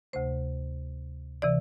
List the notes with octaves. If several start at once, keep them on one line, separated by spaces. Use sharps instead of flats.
D2 C3 A3 C5
C3 E3 D5